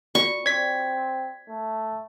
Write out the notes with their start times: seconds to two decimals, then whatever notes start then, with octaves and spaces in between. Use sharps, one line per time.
0.15 F4 F#4 D5 C#6
0.46 C4 D5 G#6 B6
1.49 A3